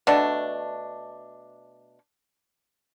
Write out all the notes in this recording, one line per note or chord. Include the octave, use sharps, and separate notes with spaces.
B2 A3 D4